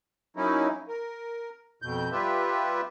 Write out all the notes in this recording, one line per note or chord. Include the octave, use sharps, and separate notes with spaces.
F#3 A#3 C#4 D#4 E4
A#4
F2 B2 G6
G3 F4 G4 B4 E5